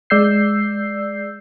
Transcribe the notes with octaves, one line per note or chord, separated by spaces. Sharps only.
G#3 D5 E6 G6 C7